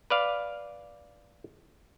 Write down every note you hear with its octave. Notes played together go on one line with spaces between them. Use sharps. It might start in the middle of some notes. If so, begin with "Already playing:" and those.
B4 D5 F5